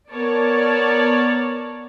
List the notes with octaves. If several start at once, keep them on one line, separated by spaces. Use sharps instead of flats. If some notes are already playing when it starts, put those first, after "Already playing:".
B3 A#4 C#5 D5 A5